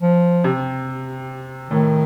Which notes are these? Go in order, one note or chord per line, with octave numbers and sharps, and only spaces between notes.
F3
C3
A2 D#3